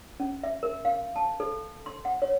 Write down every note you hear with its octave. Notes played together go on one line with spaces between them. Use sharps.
C#4
E5
A#4
F5
A5
A4
C6
F#5
C#5